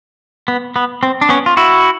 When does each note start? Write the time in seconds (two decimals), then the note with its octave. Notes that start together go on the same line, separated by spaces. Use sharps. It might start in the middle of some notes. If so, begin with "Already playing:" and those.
0.48 B3
0.76 B3
1.03 C4
1.21 D4
1.29 B3 C#4
1.46 F4
1.57 E4 F#4